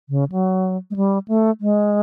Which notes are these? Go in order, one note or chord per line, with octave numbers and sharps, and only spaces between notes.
C#3
F#3
G#3
G3
A3
G#3